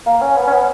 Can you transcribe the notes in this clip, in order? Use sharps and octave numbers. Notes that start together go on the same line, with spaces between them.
A#3
C#4
B3
C#4
B3